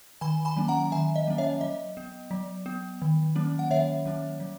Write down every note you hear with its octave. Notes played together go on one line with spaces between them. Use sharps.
D#3 G#5 B5
G#5 B5
F#3 A#3 C#4
F#5 A#5
D#3 E5 G#5
D#5
F#3 A#3 C#4
C#5 E5
F#3 D#5
B3
F#3
B3
D#3
F#3 A#3 C#4
F#5
D#3 C#5 E5
F#3 A#3 C#4
F#3